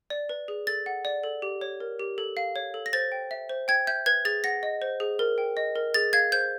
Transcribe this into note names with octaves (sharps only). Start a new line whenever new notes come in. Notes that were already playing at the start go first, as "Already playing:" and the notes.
D5
B4
G#4
A4 A6
F#5
D5
A4
G4
C#5
A#4
G4
A4
F5
C#5
A4
A#6
C5 A6
G5
E5
C5
G5 G#6
E5 G6
B4 G#6
G#4 A6
F#5 A#6
D#5
C5
G#4
A#4
G5
D#5
A#4
G#4 A6
F5 G#6
C5 G6